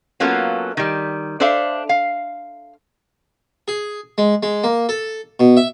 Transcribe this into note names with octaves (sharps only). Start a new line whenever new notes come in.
F#3 A#3 B3 C#4 F4 A4
D#3 G3
D4 A4 C5 D5 E5 F5
F5
G#4
G#3
G#3
A#3
A4
B2
E5